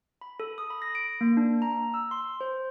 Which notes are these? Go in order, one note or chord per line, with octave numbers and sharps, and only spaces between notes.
B5
A4
D#6
B5
A#6
D7
A#3
D4
A#5
E6
C6
C5